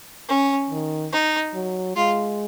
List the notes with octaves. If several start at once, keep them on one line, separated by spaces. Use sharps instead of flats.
C#4
D#3
D#4
F#3
G#3 F4